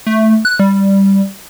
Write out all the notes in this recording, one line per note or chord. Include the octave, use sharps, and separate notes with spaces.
A3
F#6
G3